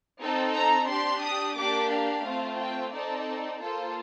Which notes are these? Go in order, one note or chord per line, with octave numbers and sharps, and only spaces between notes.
C4 D#4 A4
A#5
D4 G4 C6
D#6
A#3 D4 G4 D6
F5
A3 C4 F4
G5
C4 D#4 A4 D5
A#3 F4 A4 C5